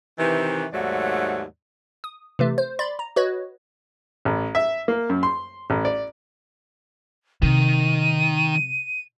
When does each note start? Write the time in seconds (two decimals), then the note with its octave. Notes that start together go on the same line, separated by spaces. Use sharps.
0.19 C3 D#3 E3
0.73 D#2 G#2 F#3 A3 D5
2.04 D#6
2.39 C3 E3 A3
2.58 C5
2.79 D5 B5 C6 A6
2.99 A#5
3.16 F#4 B4 C#5 D#5
4.25 A1
4.55 E5
4.88 A#3
5.10 F#2
5.23 C6
5.70 A1
5.85 D5
7.43 C3 D#3 D#7